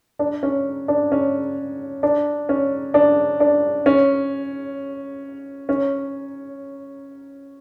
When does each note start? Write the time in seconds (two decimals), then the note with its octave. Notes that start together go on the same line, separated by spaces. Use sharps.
0.19 D4
0.43 C#4
0.88 D4
1.12 C#4
2.03 D4
2.49 C#4
2.94 D4
3.40 D4
3.86 C#4
5.69 C#4